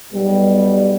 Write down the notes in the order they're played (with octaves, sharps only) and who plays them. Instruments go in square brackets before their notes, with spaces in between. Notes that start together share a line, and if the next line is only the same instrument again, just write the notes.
[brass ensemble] B1 B2 G3 B3